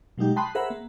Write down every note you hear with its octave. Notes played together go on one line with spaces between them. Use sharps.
B2 F#3 G#3 D#4 G4
G5 A5 B5 C6 D#6 F#6
G#4 A#4 C5 E5 F#5 B5
A#3